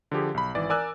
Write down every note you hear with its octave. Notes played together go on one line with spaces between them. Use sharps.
D3 F3 G4 G#4
B1 B5
G#1 E3 D5
A#4 D5 G#5 E6 F#6